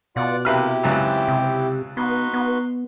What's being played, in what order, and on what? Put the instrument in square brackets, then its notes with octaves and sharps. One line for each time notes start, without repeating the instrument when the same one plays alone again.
[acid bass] B2 [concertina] F4 D5 F#5
[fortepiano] C3 B4 F6 [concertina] A#3 A4 [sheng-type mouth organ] E4 G4
[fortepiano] C#2 F#2 E3 [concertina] C4
[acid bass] C3
[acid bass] B3 [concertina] D#4 F#4 B4 [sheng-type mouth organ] C6
[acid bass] B3